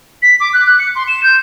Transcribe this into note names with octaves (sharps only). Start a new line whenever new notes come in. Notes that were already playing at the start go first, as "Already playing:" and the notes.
B6
D6
F#6
F#6
C#7
C6
E7
G6